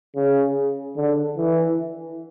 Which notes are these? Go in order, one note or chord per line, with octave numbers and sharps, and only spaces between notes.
C#3
D3
E3